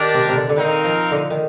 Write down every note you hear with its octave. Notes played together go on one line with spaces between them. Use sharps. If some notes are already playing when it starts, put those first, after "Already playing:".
Already playing: D#3 D4 G4 A#4 D5
C3
C3
D3
D3
D#3 C4 D#4 A#4 F5
F3
D3
D#3